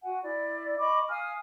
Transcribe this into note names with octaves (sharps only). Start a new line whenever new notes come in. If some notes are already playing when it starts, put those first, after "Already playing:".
F#4 F#5 G#5
E4 D5
D#5 B5 C#6 D6
F5 G#5 D#6 F6